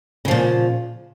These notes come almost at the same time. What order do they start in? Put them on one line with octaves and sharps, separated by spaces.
C#3 F3 A#2